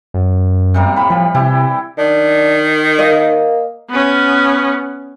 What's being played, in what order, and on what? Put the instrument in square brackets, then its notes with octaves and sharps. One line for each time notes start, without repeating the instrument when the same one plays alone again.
[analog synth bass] F#2
[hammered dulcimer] C3 G3 A#3
A2 G3 B5
[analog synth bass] F3 [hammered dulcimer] G3
[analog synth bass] C3 [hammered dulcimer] E3 E4 G4
[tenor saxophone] D#3 [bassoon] D4
[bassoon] A#3 [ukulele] D#5
[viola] B3 C#4